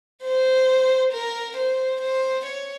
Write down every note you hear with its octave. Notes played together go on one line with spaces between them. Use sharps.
C5
A#4
C5
C5
C#5